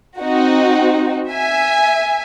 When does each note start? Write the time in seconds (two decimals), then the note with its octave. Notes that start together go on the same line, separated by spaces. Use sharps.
0.19 C4 D#4 F#4
1.30 E5 G#5